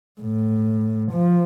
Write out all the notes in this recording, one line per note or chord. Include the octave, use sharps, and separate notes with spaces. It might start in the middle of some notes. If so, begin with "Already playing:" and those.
A2
F3